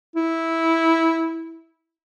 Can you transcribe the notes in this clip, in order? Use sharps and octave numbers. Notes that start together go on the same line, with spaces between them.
E4